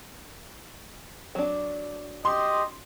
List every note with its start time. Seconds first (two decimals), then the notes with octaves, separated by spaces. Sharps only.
1.35 F#3 D4
2.25 G4 D#5 C6